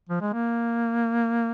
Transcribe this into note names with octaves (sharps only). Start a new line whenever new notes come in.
F3
G#3
A#3